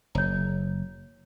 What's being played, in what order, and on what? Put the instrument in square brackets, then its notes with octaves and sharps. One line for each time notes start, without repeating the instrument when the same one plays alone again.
[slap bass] F#1 [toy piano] C#5 A#5